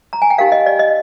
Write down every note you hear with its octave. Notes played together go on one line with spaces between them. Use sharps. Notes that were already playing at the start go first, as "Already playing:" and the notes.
A#5
G#5
G5
D#4 G4 A#4 F5
D#5
D5
D#5